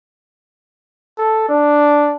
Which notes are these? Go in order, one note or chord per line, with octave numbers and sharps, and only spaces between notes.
A4
D4